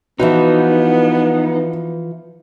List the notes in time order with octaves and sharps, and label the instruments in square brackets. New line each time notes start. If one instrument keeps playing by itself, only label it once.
[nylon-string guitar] E3 F3 F#4 [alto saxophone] B3 [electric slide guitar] D#4 [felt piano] B4